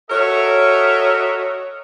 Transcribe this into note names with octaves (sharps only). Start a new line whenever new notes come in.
F#4 A4 A#4 C#5 D#5 E5